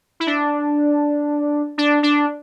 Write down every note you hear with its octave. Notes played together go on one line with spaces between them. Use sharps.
E4
D4
D4
D4